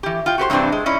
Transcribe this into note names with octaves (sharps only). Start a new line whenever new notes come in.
E3 G4
F4 G5
F#4 G4 B4 C5
G2 C3 E3 C4 D4
G#3
C#4 D#4 E4 D5